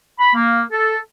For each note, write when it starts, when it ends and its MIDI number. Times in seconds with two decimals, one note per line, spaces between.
0.19 0.32 83
0.34 0.61 58
0.71 0.96 69